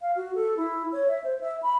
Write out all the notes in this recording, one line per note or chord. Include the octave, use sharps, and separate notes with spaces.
F5
F#4
A4
E4
C#5
E5
C5
E5
B5